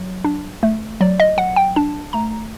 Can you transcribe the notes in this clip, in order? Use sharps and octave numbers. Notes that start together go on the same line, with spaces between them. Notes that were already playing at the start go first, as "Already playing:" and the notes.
Already playing: F#3
D4
A3
F#3 D5
D#5
F#3 F#5
G5
D4 A5
A3 A#5